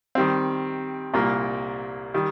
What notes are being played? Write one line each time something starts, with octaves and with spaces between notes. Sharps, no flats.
D#3 G3 C4
C2 A#2 G3 A#3
D#3 G3